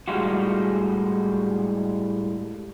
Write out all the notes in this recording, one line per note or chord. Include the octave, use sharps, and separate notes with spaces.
A2 G3 G#3 F4 F#4